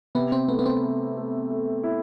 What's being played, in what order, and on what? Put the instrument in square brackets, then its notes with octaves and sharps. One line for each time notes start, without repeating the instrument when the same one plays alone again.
[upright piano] C3 [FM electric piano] B3
[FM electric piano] C4
[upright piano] A3 [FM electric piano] B3
[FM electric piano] B3
C4
[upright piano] A3
A3
A3
E4